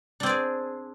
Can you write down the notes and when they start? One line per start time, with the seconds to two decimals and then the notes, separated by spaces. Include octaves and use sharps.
0.20 D4
0.23 C4
0.26 D5
0.29 G#4